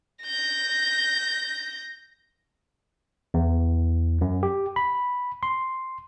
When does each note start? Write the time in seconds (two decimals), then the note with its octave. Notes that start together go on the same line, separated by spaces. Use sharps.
0.24 G6 A#6
3.34 E2
4.21 F#2
4.43 G4
4.76 B5
5.43 C6